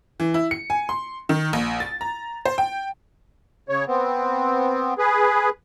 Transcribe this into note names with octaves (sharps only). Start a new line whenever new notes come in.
E3
E4
C#7
G#5
C6
D#3
A#1
A6
A#5
C5
G5
C#3 C#5
B3 C4
G#4 B4